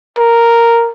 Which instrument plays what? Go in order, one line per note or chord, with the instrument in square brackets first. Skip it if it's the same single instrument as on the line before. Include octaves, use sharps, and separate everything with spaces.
[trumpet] A#4